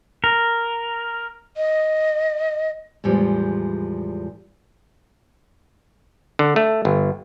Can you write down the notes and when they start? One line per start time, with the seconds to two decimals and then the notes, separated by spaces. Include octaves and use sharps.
0.24 A#4
1.57 D#5
3.04 E2 A2 F3 G3 G#3
6.39 D3
6.56 A3
6.85 G1